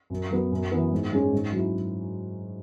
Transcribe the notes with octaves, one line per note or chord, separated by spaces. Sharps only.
F#2
F#3 B3
F#2
E3 B3
G#2
G#3 C#4 G#4
G#2
F#3 E4